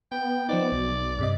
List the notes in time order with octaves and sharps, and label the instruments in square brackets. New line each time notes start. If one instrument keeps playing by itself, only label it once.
[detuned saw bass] B3 [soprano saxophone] G5
[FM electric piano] F3 C4 D#4 [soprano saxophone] D5
[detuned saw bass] B1 [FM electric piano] B2
[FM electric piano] G2 C3 D#5